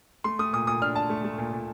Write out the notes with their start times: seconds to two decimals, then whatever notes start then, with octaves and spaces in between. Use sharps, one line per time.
0.24 A3 C6
0.39 A3 D#6
0.53 A#2 D#6
0.67 A#2 D#6
0.82 D4 F6
0.96 D4 A5
1.10 A3
1.24 A3
1.38 A#2
1.53 A#2